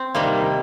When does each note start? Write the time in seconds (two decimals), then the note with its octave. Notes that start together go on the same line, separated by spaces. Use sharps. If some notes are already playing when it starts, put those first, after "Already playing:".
Already playing: C4
0.15 C3 D#3 G3 A#3